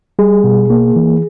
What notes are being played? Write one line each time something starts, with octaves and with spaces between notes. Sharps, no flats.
G3 G#4
B2
A#3
E3